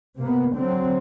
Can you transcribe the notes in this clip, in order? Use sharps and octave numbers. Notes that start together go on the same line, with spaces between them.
C3 A#3 B3
D3 F#3 C4